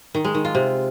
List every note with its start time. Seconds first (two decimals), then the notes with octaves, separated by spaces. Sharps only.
0.15 D#3
0.25 G#3
0.35 D#3
0.45 F4
0.55 C3